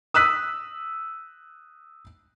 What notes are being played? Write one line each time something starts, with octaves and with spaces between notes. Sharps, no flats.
D#6 E6 F#6 B6 D#7